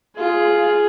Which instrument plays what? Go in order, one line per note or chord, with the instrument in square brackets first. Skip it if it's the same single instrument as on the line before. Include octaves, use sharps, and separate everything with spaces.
[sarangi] F4 [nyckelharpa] G#4